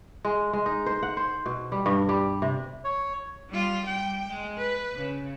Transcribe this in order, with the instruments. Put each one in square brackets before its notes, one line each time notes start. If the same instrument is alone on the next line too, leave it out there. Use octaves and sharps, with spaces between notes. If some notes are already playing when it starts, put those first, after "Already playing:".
[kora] G#3
G#3
D#4
C5
F#5
C5
B2
G3
G2
G3
C3
[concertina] C#5
[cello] G3 F4
G3 G5
G#3
B4
C#3